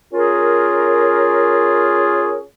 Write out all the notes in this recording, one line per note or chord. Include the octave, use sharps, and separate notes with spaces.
C#4 F4 G#4 A#4